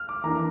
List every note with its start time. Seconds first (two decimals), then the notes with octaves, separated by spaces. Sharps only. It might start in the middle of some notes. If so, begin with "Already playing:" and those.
Already playing: F6
0.09 D6
0.24 E3 A#3 D4 A#5